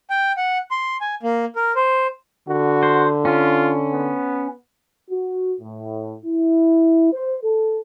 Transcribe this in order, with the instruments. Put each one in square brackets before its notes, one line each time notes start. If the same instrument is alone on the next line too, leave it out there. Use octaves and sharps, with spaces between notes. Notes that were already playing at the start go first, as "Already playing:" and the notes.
[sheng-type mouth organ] G5
F#5
C6
G#5
A#3
A#4
C5
[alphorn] D3 [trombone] F#4
[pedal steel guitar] C5
[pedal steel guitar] C#4 [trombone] F4
[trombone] B3
[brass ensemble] F#4
A2
E4
C5
A4